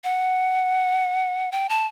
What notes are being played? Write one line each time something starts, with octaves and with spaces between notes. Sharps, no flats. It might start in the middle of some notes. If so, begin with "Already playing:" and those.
F#5
G5
A5